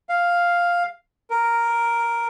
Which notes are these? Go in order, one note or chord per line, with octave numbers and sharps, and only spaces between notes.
F5
A#4